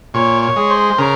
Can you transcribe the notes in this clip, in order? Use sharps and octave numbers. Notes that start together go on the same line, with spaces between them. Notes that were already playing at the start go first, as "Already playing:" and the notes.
A#2 C#5
C#5
G#3
C5
C#3 A#4